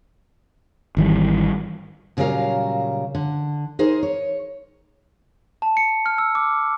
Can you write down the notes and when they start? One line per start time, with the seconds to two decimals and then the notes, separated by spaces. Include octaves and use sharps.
0.97 G#1 D#3 E3 G3
2.17 A#2 C#3 F#3 G3 A#4 F5
3.15 D3
3.79 D#4 G#4 A#4 C5
4.03 C#5
5.62 A5
5.77 C#7
6.06 F6
6.18 E6
6.35 D6